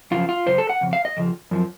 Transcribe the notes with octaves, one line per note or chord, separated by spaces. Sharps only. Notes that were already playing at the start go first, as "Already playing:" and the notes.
F#2 C#3 F3 F4
F4
F#2 C#3 C5
A4
F#5
F2 C#3
F5
D#5
F2 C#3 F3
F#2 F3